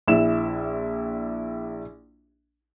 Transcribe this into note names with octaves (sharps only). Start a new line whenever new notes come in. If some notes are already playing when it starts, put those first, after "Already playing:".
A#1 E4 E7